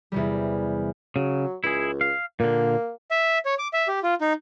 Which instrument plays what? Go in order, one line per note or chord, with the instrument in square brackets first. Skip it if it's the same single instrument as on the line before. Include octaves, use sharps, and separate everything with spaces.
[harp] E2 C3 G3
[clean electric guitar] C#3 [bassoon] F#3
[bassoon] C#2 [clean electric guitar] E4 G#4
[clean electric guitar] F5
[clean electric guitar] A#2 D3 [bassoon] A#3
[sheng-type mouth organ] E5
C#5
D6
E5
G4
F4
D#4